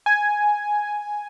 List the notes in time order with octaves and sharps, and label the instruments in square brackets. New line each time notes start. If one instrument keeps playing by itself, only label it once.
[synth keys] G#5